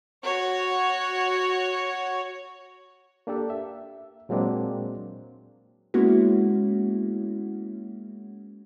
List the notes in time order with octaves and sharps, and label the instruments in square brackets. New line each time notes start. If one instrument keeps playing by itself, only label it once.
[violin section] F#4 C#5
[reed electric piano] A#3 D4 G4 A4
E5
A#2 F#3 G#3 A#3 C4 D4
[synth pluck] G#3 A#3 B3 C#4 E4 F#4